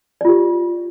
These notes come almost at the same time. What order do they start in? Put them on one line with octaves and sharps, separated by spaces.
D5 F4 G4